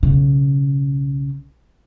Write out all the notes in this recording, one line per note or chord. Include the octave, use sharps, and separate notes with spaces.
B1 C#3